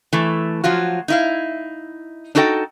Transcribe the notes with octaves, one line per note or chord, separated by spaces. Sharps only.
E3 A3
F3 F#3 F4 F#4
D#4 E4 F5
D4 D#4 F#4 A4 D#5 G5